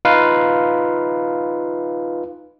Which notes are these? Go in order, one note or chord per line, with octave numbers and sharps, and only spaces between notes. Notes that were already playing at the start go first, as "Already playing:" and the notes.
D#4 F4 B4 F5